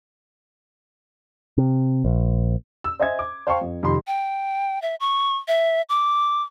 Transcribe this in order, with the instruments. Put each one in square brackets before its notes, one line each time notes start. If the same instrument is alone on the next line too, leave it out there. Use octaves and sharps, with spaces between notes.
[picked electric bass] C3
A#1
[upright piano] E6
C5 D#5 E5 G#5 G#6
D6
C5 F5 G5 A5 C#6
F2
F2 C3 D#3 B5 C6
[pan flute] G5
E5
C#6
E5
D6